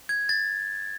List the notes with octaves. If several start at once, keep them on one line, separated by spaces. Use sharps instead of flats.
G#6
A6